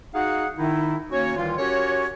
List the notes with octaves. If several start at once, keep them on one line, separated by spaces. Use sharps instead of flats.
D#4 F#4 G#4 F5 F#5
D#3 D#4 E4
A#3 C#4 F#4 C#5
C2 D#3 E3 F4
C#4 F#4 G4 A#4 C#5